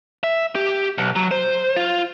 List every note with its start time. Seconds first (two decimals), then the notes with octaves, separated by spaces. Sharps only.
0.24 E5
0.55 G4
0.98 B1
1.16 F#3
1.31 C5
1.76 F4